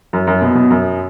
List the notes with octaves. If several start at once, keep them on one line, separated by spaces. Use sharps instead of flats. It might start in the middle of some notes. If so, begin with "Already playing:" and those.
F#2
F#2
B2
B2
F#2